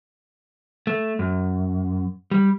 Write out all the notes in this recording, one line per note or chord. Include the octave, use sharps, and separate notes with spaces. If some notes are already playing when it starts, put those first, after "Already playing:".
A3
F#2
G3